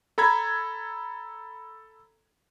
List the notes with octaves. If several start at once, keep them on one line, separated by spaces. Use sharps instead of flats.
A4 A#5 B5 G#6